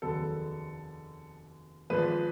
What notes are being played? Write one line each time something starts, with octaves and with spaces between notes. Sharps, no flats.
F1 D#2 C#3 F#3 B3 A4
G#1 G#2 F3 B4